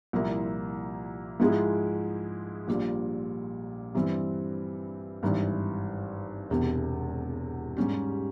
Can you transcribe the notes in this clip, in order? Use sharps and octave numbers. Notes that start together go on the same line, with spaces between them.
C2 A#2 F3 A#3 E4
G#2 F3 G#3 E4 G#4
A#1 A#2 G3
G2 E3 G3 C4
G#1 G2 E3
E1 E2 C3
G#2 G3 C#4 G4